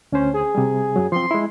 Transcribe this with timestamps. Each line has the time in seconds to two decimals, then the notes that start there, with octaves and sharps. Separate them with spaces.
0.12 D2 C#4 C5
0.34 G#4
0.55 C3 G3
0.96 F#2 F#3
1.12 F3 C4 C6
1.31 G#3 E4